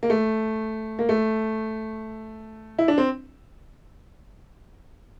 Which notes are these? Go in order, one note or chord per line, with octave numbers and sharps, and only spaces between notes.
A#3
A3
A#3
A3
E4
D4
C4